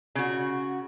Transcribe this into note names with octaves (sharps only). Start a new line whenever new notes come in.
C#3 F#4